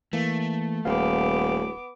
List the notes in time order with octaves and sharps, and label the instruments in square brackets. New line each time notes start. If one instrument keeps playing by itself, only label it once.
[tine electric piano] E3 A#3 [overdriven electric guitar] A3
[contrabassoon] D#1 [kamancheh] B3 D6 [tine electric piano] F5